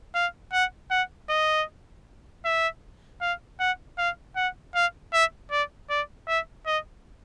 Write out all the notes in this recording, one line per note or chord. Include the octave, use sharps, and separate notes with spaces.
F5
F#5
F#5
D#5
E5
F5
F#5
F5
F#5
F5
E5
D5
D5
E5
D#5